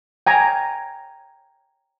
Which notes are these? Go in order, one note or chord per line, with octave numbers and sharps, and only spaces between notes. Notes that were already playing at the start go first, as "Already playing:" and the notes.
G5 G#5 A#5